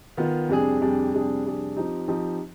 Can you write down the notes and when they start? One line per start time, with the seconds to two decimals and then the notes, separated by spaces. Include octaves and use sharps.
0.17 D#3 B3 F4
0.49 F2 C3 G3 D4 G#4
0.81 F2 C3 G3 D4 G#4
1.13 F2 C3 G3 D4 G#4
1.45 F2 C3 G3 D4 G#4
1.77 F3 C4 D#4 G4
2.08 F3 C4 D#4 G4